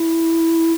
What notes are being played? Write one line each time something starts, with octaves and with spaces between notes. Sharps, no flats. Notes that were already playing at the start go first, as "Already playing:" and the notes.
Already playing: E4